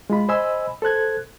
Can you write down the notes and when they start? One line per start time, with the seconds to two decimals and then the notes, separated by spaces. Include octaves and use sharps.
0.10 G#3 F4 B5
0.29 C5 D#5 G#5 B5 E6
0.82 A4 C5 F#6 G#6